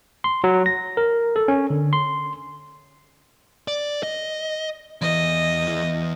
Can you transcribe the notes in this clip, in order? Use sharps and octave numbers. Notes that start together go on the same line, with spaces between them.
C6
F#3
A#6
A#4
A4
C#4
D3
C6
D5
D#5
E2 E3 D#5